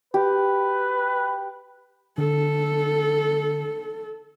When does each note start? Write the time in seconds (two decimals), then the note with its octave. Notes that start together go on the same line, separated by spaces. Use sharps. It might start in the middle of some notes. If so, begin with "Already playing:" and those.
0.14 G4 B4
2.18 D3 A4